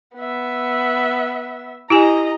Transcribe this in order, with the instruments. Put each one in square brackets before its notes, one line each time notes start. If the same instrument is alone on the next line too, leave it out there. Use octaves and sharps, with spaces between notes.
[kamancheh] B3 E5
[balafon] E4 G4 G#5 [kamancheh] D#5 A#5